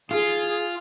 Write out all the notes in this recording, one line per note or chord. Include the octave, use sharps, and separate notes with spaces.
F4 G#4